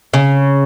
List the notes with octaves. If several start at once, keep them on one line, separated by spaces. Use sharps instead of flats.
C#3